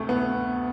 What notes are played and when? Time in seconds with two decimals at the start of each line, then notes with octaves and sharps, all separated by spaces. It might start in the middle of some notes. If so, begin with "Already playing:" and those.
Already playing: D2 C3 A3
0.09 B3